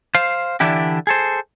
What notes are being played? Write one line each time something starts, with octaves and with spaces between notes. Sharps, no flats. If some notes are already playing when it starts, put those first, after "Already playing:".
C5 F5
D3 E3 D4 E4 G4
G#4 A4 C5